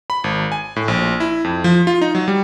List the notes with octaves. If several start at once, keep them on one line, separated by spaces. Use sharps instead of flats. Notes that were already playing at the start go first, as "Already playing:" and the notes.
B5
G#1
G#5
A2
A#1
E4
F2
F3
F4
D#4
F#3
G3